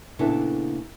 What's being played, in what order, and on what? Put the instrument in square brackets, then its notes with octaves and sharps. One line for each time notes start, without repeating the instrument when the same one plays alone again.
[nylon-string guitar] A#2 C#3 B3 D4 E4 A4